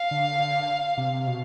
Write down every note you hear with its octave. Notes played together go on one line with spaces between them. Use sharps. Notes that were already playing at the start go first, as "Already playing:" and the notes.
Already playing: F5
D3
D3
C3
B2